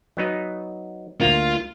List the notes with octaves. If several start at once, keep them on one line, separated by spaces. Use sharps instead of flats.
F#3 B3 D#4
D2 A#3 F4